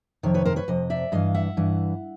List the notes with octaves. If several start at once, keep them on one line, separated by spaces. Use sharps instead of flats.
F2 C3 D#3 C#5
B4 C#5
A#4 C5
B4 C#5
F2 C3 D#5
D5 E5
G2 E3 D#5 F5
E5 F#5
G2 E3